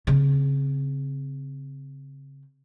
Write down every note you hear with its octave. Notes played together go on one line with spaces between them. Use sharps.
C#3 C4